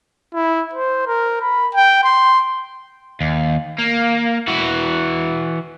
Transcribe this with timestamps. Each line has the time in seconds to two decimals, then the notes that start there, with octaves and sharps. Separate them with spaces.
0.34 E4
0.74 C5
1.07 A#4
1.41 B5
1.74 G5
2.04 C6
3.21 D#2
3.79 A#3
4.48 E3 F#4